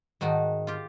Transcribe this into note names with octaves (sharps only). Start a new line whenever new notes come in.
G#2 D#3 D#4 F#4 A5
F4 G4